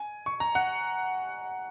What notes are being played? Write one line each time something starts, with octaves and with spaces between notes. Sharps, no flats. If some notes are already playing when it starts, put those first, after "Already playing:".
Already playing: G#5
C#6
A#5
F#5